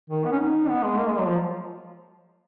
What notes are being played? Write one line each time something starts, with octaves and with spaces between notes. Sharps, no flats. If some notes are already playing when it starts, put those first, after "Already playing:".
D#3
B3
C#4
D#4
B3
G#3
A#3
G#3
F#3
F3